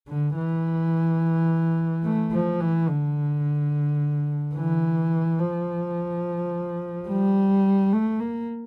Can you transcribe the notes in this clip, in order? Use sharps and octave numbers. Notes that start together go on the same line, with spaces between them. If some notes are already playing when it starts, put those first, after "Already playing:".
D3
E3
A3
F3
E3
D3
E3
F3
G3
A3
A#3